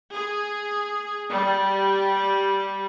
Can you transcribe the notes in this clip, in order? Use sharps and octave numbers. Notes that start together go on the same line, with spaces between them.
G#4
G3